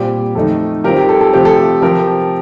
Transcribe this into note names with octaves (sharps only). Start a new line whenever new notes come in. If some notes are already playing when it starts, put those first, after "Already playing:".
Already playing: A#2 G3 C4 F4 G4
F2 D#3 A3 D#4 A4
D#3 G3 C4 F4 G4 A#4
G4
A4
A4
C3 F3 A3 C4 F4 G4
A4
G4
C3 F3 C4 F4 G4 A#4